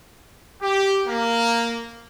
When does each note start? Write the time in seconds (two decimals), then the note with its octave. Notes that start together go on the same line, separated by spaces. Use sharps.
0.61 G4
1.07 A#3